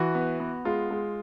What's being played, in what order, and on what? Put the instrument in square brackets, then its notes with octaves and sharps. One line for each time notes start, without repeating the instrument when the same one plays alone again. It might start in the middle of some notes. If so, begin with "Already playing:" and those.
Already playing: [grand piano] E3 F#4
B3
B3
G#3 F4
G#3